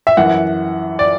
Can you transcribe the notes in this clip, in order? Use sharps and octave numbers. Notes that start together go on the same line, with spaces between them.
E5
F#2 E3 F#5
D5